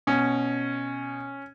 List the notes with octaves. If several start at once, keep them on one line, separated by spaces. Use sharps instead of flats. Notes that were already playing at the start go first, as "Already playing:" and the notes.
B2 C#4